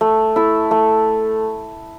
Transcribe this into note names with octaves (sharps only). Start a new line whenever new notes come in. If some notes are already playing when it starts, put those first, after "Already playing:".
A3
E4 A4
A3